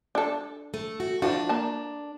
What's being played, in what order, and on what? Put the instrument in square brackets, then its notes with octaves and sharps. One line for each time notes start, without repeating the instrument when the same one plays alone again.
[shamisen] D4 A4
[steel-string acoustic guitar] A3
F#4
[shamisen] E3 F3 F#4 [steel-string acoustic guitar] D4
[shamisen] A#3 A5